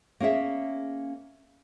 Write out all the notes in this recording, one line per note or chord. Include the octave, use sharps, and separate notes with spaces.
A#3 C#4 G#4 E5